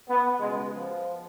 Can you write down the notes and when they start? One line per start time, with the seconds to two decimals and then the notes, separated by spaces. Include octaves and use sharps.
0.09 B3
0.40 C#2 G#3
0.45 B2
0.73 F3